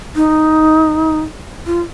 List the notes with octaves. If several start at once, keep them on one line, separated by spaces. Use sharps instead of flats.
D#4
F4